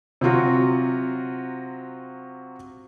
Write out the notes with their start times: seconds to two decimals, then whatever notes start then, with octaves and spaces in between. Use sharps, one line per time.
0.21 C3 F#3 F4 F#4